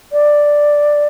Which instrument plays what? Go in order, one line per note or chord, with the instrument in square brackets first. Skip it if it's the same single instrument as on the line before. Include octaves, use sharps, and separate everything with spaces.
[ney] D5